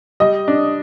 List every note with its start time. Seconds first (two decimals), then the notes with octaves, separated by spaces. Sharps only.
0.20 G3 D#5
0.48 D4